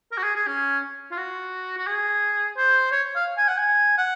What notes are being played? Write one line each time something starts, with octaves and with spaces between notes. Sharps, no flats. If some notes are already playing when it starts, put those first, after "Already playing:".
A#4
F#4
G#4
G#4
C#4
F4
F#4
F#4
G#4
C5
C#5
F5
G#5
F#5
G#5
F#5